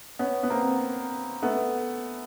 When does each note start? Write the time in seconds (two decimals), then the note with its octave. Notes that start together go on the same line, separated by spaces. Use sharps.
0.19 B3 C#4
0.43 B3
0.50 A#3 C4
1.42 A3 B3